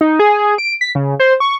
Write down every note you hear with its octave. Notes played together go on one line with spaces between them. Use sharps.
D#4
G#4
D7
B6
C#3
C5
C#6